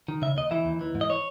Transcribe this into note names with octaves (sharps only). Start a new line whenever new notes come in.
D#3
C#3 E5
D#2 D#5
E3 E5
D#2
E3
G#2
D#5
C#5